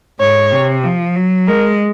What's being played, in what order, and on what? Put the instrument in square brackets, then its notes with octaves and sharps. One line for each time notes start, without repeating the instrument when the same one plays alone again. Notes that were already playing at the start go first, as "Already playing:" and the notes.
[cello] G#2 [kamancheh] C#5
[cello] C3
F3
F#3
[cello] G#3 [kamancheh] A#4